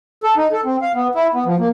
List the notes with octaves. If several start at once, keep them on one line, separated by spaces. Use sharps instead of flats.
A4
D#4
A4
C4
F5
B3
E4
B3
F3
A#3